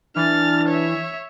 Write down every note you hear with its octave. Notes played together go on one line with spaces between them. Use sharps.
E3 D4 F6 A6
C#5 E5